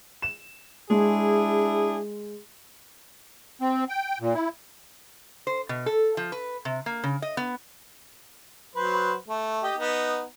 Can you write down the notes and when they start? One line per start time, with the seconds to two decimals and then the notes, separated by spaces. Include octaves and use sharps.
0.22 E7
0.90 G#3 D4 E4 G#4
3.61 C4
3.89 G5
4.21 A#2
4.34 E4
5.47 C5
5.69 B2
5.86 A4
6.17 F3
6.32 B4
6.65 C3
6.86 A#3
7.04 C#3
7.22 D#5
7.37 B3
8.76 F#3 B4 C5
9.28 A3
9.63 G4 D#5
9.77 B3 D#4